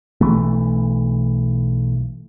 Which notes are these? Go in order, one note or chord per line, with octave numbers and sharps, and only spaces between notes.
B1 E3 A3